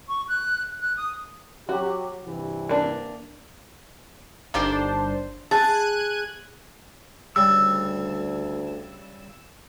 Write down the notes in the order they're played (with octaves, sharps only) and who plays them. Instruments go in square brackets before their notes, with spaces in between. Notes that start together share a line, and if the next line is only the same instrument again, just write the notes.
[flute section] C#6
F#6
F#6
D#6
[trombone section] F#3 G4 [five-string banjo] F#4
[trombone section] G2 C3 E3
[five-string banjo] A#3 D4
[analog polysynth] G1 D4 C5 [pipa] D#3 C4 G4
[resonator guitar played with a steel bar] G#4 [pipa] A5 [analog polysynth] F#6 G#6 D#7
[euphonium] D2 [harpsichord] C#3 G3 [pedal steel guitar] E6